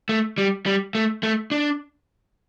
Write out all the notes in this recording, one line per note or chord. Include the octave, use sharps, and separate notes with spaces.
A3
G3
G3
A3
A3
D4